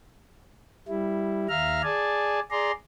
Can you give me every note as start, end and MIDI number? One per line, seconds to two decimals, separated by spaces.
0.88 1.47 55
0.88 1.47 64
1.49 1.82 39
1.49 1.82 76
1.49 1.82 77
1.49 1.82 82
1.49 1.82 89
1.83 2.40 68
1.83 2.40 74
1.83 2.40 80
1.83 2.40 81
2.51 2.72 68
2.51 2.72 74
2.51 2.72 82
2.51 2.72 84